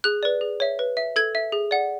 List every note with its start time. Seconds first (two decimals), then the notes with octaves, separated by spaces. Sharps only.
0.04 G#4 F#6
0.23 B4 D5
0.41 G#4
0.60 C#5 E5
0.79 B4
0.97 E5
1.16 A4 G#6
1.35 E5
1.52 G#4
1.71 D5 F#5